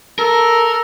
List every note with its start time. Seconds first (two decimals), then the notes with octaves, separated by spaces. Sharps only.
0.19 A4 A#4